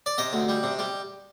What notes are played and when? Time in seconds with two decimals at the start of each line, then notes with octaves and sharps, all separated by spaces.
0.06 D5
0.18 C3 D#5
0.33 D2
0.49 G3
0.63 C3
0.79 G3